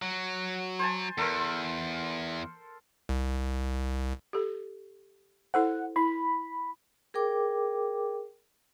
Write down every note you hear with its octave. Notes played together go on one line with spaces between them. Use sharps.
F#3
C5 G#5 A5
E2 A4 A#4 C5
C2
G4 A4
E4 A4 C5 F#5
E4 B5
G#4 A#4 G5 D6